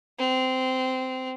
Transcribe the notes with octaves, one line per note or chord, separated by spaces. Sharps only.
C4